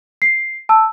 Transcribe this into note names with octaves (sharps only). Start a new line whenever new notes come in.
C7
A5 E6